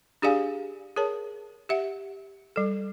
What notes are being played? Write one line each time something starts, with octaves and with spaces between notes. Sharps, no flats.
D4 G4 G#4 D5 F5 G#5
G#4 A#4 C#5 A5
G4 E5 F#5
G3 A4